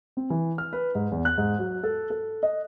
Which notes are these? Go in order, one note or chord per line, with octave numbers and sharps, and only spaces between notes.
C4
E3
F6
B4
G#2
E2
F#6
G#2
F#3
A4
A4
D#5